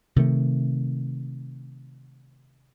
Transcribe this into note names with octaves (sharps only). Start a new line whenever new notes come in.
C3 D#3 A3